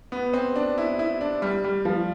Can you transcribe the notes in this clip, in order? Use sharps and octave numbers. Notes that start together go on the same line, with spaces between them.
B3
C4
D4
E4
E4
D4
G3
G3
F3